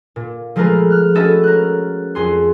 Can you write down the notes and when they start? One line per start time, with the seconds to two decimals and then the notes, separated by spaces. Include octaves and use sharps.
0.16 A#2
0.56 F3 G#3 A3 F4 A#4 B4
0.90 F6 F#6
1.15 C#4 F#4 A4 B4 D#5 E5
1.44 A#4 F#6
2.15 F2 G#4 C6